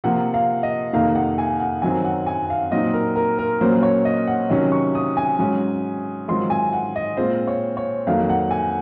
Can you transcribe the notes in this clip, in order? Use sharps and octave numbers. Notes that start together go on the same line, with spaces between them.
C3 F3 A#3 F4 F#5
F5
D#5
F2 C3 D#3 A#3 D#4 F5
F#5
G#5
F#5
F#2 D#3 F#3 C4 G#5
F#5
G#5
F5
A#2 F#3 C4 D#4 D#5
A#4
A#4
A#4
A#2 F#3 A#3 C#4 C5
C#5
D#5
F#5
C3 D#3 F#3 C#4
C#6
D#6
G#5
G#2 F#3 C#4
G#2 D#3 F#3 C4 F4 C6
G#5
F#5
D#5
A#2 G#3 C4 F4 C5
C#5
C#5
F2 D#3 F#3 A#3 F5
F#5
G#5